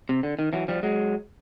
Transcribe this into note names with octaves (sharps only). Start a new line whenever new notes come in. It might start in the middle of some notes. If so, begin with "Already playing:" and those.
C3
D3
D#3
E3 F#3
F3 G3
F#3 G#3